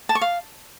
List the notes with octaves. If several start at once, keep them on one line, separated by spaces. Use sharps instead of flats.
A5
C#6
F5